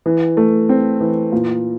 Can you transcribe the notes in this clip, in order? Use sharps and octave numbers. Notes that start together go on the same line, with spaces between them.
E3
A3
C4
E3
A#2